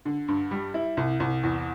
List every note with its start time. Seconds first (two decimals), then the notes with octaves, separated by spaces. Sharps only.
0.05 D3
0.28 G2
0.51 G3
0.74 E4
0.97 C2
1.20 C2
1.43 E2